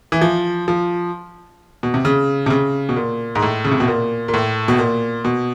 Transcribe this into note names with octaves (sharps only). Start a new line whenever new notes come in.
E3
F3
F3
B2
C3
C#3
C3
C#3
B2
A#2
G#2
A2
C#3
C3
B2
A#2
A#2
A2
B2
A#2
B2